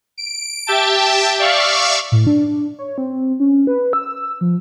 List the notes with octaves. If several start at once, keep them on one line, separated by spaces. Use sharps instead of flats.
D7
G4 E5 G5 A5
D5 E5 F5 C#6
A2
D4
C#5
C4
C#4
B4
E6
F3